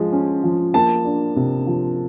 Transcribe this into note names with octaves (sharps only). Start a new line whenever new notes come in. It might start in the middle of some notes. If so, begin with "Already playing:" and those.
Already playing: F3 G#3
C#4
F3
A#3 A5
D4
C3
F3